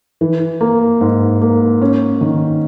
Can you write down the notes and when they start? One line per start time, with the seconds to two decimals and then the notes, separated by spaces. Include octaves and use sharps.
0.21 E3
0.61 A#3
1.01 G#2
1.41 A#3
1.82 C#4
2.21 D#3